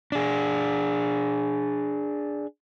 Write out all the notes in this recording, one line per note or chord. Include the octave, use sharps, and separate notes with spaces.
D4 G#4